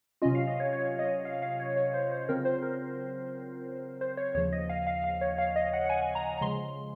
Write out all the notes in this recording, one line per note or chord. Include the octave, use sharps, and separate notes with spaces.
C3 F#3 C#4 F4 D#5
F5
D#5
C#5
C#5
D#5
F5
F5
C#5
C#5
C5
C5
C#3 F#3 C4 F4 A#4
C5
A#4
C5
C#5
D#2 C#3 F3 C#5
D#5
F5
F5
F5
C#5
F5
D#5
F#5
F#5
G#5
A#5
A#5
C#3 F3 G#3 C6